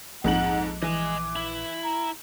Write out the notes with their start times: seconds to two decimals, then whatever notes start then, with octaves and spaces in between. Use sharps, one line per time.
0.24 A#1 F2 G#2 F#5 F#7
0.82 E3 D#5 G#5 D6
1.36 E4
1.84 A#5